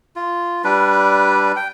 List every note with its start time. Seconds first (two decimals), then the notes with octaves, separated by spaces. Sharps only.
0.16 F4
0.64 G3 D4 B4
1.56 G5